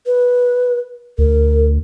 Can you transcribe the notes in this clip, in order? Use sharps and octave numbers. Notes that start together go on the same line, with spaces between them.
B4
D2 A#4